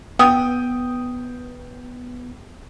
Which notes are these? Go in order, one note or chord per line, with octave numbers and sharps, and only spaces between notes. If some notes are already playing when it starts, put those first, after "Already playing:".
B3 G5 D#6